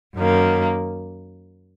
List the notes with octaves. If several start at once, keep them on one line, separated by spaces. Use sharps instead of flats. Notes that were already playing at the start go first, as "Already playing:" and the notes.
F#2 D#3 A#3